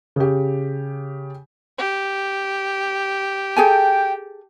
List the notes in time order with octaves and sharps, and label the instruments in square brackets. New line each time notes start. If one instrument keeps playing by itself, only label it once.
[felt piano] C#3 G4
[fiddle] G4
[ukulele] G#4 A4 G#5 [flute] G5